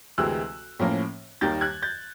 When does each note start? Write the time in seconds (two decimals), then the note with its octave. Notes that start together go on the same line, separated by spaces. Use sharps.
0.18 D2 C3 E3 G#3 C4 E6 F#6
0.79 A2 F3 A#3 C#4
1.41 D#2 D#3 G3 A#3 G6 A6
1.61 F#6 G#6
1.82 G6 A6